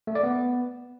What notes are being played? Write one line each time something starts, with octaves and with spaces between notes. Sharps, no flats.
A3
D5
B3